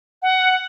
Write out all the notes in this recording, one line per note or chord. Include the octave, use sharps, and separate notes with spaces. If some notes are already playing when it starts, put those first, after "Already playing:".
F#5